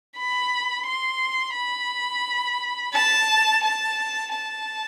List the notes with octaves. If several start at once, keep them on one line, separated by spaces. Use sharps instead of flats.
B5
C6
B5
A5
A5
A5